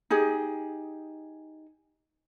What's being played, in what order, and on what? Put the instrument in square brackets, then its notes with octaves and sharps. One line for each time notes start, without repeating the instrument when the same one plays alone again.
[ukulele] D#4 G4 G#4